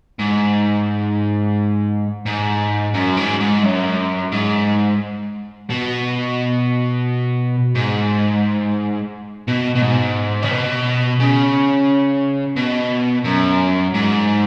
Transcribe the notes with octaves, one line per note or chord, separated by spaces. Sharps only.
G#2
G#2
F#2
G#2
G#2
F#2
G#2
B2
G#2
B2
B2
G#2
C#3
B2
C#3
B2
F#2
G#2